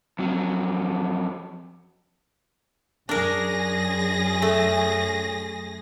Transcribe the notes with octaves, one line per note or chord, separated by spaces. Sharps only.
F2 F#3
F#2 D4 G#4 A#4 A#6
A3